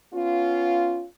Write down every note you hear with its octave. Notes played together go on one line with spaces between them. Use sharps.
B3 C#4 F4